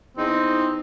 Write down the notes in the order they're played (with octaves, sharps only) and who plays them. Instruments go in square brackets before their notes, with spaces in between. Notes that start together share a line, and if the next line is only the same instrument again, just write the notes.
[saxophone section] E2 D#4 [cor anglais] C4